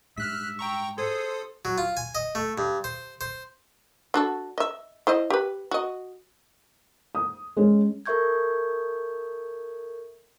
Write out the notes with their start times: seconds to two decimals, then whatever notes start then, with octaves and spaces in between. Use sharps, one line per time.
0.17 G#2 G3 E5 F6 F#6 B6
0.59 G5 A#5 C#6
0.98 G#4 A4 C5 C6 D#6
1.65 F#3
1.78 F4
1.97 G#5
2.15 D#5
2.35 A3
2.58 G2
2.84 C5
3.21 C5
4.14 D4 F#4 A4
4.58 D#5 E5
5.07 E4 C5 D#5
5.30 G4 B4
5.71 F#4 D#5
7.15 D#6
7.57 G#3 C#4
8.06 A4 A#4 E5 C#6 G6 G#6